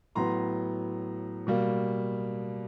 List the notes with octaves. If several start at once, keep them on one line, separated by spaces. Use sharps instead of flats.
A2 F#3 B3 A#5 C6
B2 G3 A#3